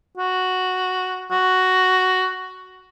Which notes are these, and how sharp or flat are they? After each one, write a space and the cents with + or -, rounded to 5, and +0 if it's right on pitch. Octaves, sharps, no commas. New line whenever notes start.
F#4 +0
F#4 +5